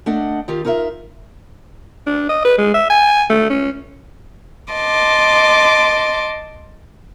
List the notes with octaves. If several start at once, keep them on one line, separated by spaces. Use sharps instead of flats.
A3 D4 D#5 F#5
D#3 F4 G4
D#4 F4 A#4 C#5 E5
D4
D#5
B4
G#3
E5
G#5
A3
C#4
D#5 A5 C6 D6